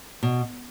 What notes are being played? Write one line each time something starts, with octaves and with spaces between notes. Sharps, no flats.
B2